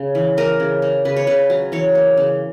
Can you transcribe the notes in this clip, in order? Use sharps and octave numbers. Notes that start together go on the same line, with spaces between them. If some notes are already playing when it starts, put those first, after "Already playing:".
Already playing: C#3
E3
A#3 A#4
C#3
A#3
C#3 B4
C#5
C#3 B4
F#3
E3 C#5
A#3
C#3